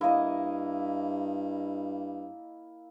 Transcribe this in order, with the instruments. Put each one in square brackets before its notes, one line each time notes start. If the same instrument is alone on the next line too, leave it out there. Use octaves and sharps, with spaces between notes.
[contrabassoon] G2 [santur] A#3 D#5 [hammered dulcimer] E4